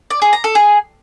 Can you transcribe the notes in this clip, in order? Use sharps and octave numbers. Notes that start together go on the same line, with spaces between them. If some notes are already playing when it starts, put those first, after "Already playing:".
D5
G#4
A#5
A4
G#4